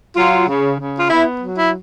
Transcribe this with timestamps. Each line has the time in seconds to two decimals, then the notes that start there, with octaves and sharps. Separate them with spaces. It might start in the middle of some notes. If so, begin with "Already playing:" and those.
0.16 F#3 F4
0.48 C#3
0.78 C#3
0.99 F4
1.09 B3 E4
1.41 F#3
1.56 E4